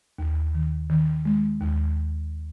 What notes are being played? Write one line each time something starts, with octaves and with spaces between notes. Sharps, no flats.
D#2
D#3
D#3
G#3
D#2